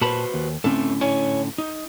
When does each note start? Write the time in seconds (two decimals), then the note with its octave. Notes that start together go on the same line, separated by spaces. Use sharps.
0.01 A#2 F#4 B4 C5 A5 B5
0.34 D#2
0.64 A2 D3 A3 C4 C#4 A4
1.01 E4 C#5 G#5
1.58 D#4